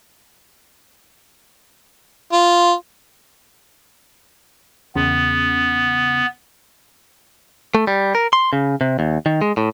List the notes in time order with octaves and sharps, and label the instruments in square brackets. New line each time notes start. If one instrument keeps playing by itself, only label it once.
[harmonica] F4
[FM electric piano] E2 C#3 [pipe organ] B3
[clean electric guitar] A3
G3
A#4
C6
C#3
C3
D#2
D#3
G#3
A2